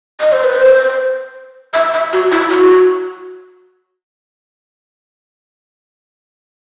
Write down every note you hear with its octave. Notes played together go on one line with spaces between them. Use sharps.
D#5
C5
B4
C5
E5
E5
F#4
E4
F#4